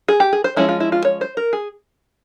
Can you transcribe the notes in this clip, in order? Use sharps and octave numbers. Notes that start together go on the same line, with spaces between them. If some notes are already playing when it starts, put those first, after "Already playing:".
G#4
G4
G#4
C5
F3 G#3 C#4 E4
F4
E4
F4
C#5
C5
A#4
G#4